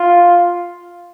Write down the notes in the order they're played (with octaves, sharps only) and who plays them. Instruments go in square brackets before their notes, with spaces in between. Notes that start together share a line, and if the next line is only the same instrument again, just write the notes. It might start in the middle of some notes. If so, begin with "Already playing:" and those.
Already playing: [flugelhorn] F4